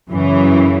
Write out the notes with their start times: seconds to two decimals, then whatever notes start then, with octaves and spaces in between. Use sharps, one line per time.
0.11 F#2 C#3 E3